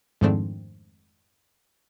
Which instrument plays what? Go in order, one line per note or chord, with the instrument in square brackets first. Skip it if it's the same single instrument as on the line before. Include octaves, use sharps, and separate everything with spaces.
[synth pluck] F2 G#2 D#3 A3 C4 D4